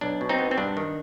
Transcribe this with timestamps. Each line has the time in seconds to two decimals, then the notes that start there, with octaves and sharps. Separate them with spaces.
0.01 B1 D4
0.21 B2
0.29 C4 D#4
0.39 B3
0.51 C4
0.57 G2 D4
0.77 D#3